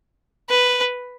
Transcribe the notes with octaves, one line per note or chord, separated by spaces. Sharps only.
B4